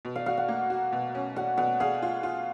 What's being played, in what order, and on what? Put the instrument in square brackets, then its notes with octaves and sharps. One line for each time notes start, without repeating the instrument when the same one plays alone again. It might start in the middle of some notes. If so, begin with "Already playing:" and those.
[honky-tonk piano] B2
[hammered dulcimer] F5
[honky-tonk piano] F#4 [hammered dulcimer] F5
[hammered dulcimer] F#5
[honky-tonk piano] A#3
F#4
B2
C#4
[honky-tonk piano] F#4 [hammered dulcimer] F#5
[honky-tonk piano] B2 [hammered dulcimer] F#5
[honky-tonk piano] G#4 [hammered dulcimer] F5
[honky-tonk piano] F4
F4